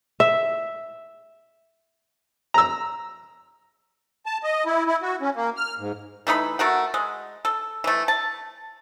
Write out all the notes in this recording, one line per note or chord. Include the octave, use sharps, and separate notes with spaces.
E5
A#5 E6
A5
D#5
E4
E4
F#4
C#4
A#3
F6
G#2
E3 A3 D#4 B5
A3 F#4 A#4 F#5
G#3
A4
E3 A3
A5